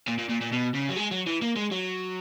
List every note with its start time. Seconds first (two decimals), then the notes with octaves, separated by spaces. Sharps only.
0.08 A#2
0.19 A#2
0.30 A#2
0.42 A#2
0.53 B2
0.75 C#3
0.90 F#3
0.97 G#3
1.12 F#3
1.27 E3
1.42 A#3
1.56 G#3
1.71 F#3